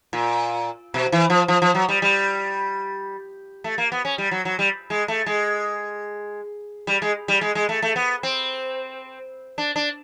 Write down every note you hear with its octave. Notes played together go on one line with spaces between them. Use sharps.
A#2
B2
E3
F3
F3
F3
F#3
G3
G3
A3
A#3
B3
C#4
G3
F#3
F#3
G3
G#3
A3
G#3
G3
G#3
G3
G#3
G#3
A3
A3
B3
C4
D4
D4